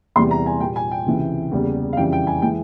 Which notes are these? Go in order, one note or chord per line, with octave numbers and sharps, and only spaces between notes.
E2 C3 E3 G3 C6
A#5
G#5
A#2 G3 A#3 G5
G#5
G5
C#2 C3 E3
E2 C#3 G3 A#3
F5
F2 C#3 E3 G3 G5
G5
G#5
E3 G#3 G5